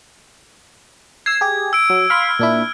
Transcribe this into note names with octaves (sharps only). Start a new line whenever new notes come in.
E6 G#6 C7
G4 G#4
E6 D7
F#3
F5 B5 C6 F6
A#2 D4 E4